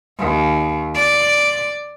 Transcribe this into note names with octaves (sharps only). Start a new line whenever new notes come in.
D#2
D5